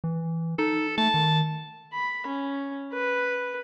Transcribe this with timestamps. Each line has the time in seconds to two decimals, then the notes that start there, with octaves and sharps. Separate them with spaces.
0.04 E3
0.59 D#4 A4
0.98 A3 A5
1.14 D#3
1.93 B5
2.27 C#4
2.93 B4